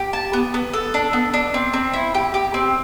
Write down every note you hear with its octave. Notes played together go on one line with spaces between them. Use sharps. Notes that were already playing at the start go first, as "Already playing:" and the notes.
Already playing: G4
A5
B3
B3
A4
D4
B3
D4
C4
C4
E4
G4
G4
C4